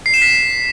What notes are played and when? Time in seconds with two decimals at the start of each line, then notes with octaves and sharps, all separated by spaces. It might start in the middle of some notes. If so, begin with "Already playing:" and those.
0.06 C7
0.14 E7
0.22 B6
0.30 C7